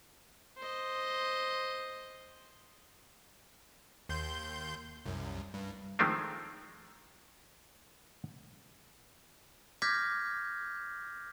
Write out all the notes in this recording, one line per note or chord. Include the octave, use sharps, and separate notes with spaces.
C5 D#5
D#2 C6 G6
C2 F#2
G2
D#3 F3 G#3 A3 C4 D4
D6 F6 G6 G#6 A#6 B6